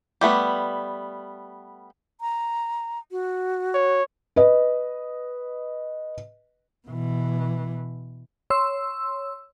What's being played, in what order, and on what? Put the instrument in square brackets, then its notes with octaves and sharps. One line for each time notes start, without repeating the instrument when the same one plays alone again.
[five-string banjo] G3 A3 B3 B4
[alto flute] A#5
F#4
[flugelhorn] C#5
[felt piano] B4 D#5
[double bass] B2 E3
[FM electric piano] C#5 C6 E6